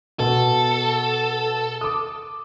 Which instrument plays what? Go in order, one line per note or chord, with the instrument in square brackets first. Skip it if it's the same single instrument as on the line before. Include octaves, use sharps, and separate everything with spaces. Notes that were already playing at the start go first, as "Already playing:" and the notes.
[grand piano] B2 [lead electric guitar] A4
[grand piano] D6 D#6